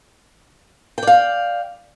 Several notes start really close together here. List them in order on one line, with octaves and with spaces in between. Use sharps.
G5 D5 F5